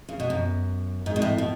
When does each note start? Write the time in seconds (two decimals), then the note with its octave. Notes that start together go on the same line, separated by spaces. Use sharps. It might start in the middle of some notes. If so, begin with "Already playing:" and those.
0.09 C#3
0.20 B2
0.30 F#2
1.06 G#2
1.16 B2
1.22 A2
1.38 B2